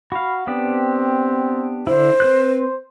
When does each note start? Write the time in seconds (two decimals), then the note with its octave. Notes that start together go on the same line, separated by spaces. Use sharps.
0.12 F#4 F5 B5
0.47 B3 C4 D4 G4
1.87 D3 E4 C5
2.20 C4 B4 F#6
2.59 C5